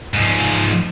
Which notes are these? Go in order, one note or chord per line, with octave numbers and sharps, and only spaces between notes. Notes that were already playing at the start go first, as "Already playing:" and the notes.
G#2 F3